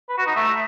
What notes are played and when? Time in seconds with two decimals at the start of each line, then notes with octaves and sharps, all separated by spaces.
0.09 B4
0.18 F#4
0.27 D#4
0.36 A3